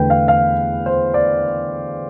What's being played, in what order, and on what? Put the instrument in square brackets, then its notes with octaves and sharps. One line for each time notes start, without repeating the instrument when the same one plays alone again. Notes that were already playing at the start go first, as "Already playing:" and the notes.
Already playing: [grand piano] E2 D3 A3 B4 G5
F5
F5
C5
D5